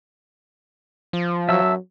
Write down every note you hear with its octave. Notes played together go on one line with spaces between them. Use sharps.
F3
F#3 E5 A5 E6